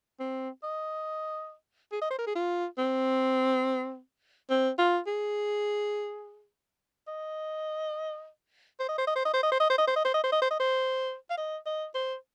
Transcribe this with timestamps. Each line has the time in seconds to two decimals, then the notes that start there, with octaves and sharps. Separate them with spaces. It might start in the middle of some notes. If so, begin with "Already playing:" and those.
0.20 C4
0.63 D#5
1.92 G#4
2.01 D#5
2.10 C5
2.18 A#4
2.27 G#4
2.35 F4
2.78 C4
4.50 C4
4.79 F4
5.07 G#4
7.08 D#5
8.80 C5
8.89 D#5
8.98 C5
9.07 D#5
9.16 C5
9.25 D#5
9.34 C5
9.43 D#5
9.52 C5
9.60 D#5
9.70 C5
9.78 D#5
9.87 C5
9.96 D#5
10.05 C5
10.14 D#5
10.24 C5
10.32 D#5
10.42 C5
10.51 D#5
10.60 C5
11.30 F5
11.37 D#5
11.66 D#5
11.95 C5